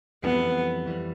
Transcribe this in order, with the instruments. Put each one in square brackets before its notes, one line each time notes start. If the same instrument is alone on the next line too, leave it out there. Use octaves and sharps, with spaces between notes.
[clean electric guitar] F2 E3 G3 [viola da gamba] B3
[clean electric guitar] F2 E3 G3